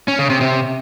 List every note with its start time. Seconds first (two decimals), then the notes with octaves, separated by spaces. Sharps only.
0.08 C#4
0.19 C#3
0.30 C3
0.41 C3